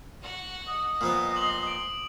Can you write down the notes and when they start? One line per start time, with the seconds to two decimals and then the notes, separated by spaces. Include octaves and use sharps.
0.22 F#4 F#5
0.68 D#5
1.01 A#2 F3 B3
1.34 C6 D6 D#6 F#7
1.67 D7